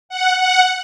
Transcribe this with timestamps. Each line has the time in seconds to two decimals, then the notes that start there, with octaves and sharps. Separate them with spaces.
0.09 F#5
0.38 F#5